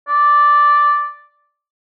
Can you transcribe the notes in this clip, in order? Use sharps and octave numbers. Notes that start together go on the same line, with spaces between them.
D5